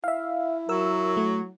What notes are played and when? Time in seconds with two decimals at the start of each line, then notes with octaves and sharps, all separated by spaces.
0.04 E4 E5 F5
0.69 F#3 A#4 E6
1.17 A3